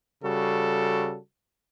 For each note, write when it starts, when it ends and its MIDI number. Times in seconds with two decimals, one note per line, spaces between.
0.24 1.18 49
0.24 1.18 55
0.24 1.18 66
0.24 1.18 69